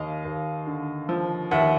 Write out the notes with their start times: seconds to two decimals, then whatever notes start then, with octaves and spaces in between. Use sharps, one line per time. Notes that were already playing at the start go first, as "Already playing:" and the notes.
Already playing: D#2 D#5 F5
0.25 D#2
0.67 D3
1.09 F3
1.51 D#2 E5 F#5